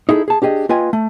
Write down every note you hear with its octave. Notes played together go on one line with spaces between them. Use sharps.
D#4 E4 G#4 A4
G#4 A5
D4 G4 G#4 D#5
A#3 F4 B4 D#5 G5 G#5
A3